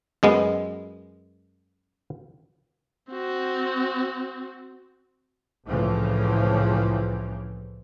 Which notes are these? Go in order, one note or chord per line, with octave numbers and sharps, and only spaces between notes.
F#2 G#3 B3
C4 F#4
C2 A2 C#3 E3 F3